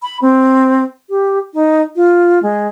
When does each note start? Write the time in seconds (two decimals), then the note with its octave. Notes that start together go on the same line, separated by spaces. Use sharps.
0.02 B5
0.22 C4
1.10 G4
1.54 D#4
1.96 F4
2.43 G#3